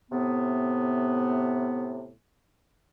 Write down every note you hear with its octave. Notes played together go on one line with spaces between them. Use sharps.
A2 C3 B3